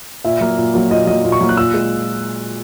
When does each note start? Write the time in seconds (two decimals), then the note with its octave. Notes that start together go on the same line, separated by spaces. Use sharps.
0.25 A#2 E5
0.41 F#3 A#3
0.58 A#2
0.74 F#3 A#3
0.91 A#2 D#5
1.07 F#3 A#3 D#5
1.24 A#2
1.32 C#6
1.40 F#3 A#3
1.49 F#6
1.57 A#2 E6
1.74 G#3